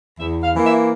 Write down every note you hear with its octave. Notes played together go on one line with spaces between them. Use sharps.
E2 E5
F5
E3 A#3
E5